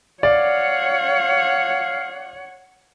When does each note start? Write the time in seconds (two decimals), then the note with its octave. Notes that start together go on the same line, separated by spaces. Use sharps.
0.23 C#5 D5 F5 F#5